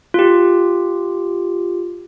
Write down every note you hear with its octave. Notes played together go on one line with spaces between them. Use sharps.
F4 G4